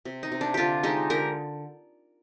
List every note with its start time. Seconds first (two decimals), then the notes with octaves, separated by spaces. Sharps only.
0.05 C3
0.23 D#4
0.32 C3
0.41 D4
0.54 D3 D4 F4 G4
0.83 G#3 D#4 G4
1.10 D3 G4 A#4